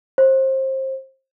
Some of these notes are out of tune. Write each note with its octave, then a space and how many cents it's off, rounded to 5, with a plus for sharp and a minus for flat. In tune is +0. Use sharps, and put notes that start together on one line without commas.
C5 +25